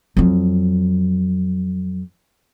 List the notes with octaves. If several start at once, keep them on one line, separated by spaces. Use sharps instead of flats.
F2 F#3